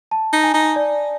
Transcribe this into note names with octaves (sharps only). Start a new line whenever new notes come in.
A5
D#4
G#5
D#4
D5